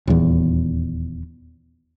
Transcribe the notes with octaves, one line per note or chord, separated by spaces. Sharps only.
D#1 E2